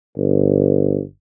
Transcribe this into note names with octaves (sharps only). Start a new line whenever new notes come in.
G1